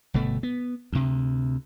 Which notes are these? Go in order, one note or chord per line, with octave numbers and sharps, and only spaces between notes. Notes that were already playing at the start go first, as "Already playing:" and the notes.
G1 B2 A3
B3
D2 C3